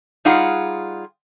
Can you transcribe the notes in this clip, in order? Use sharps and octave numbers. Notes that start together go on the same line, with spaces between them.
G3 D#4 F4 G#4 F#5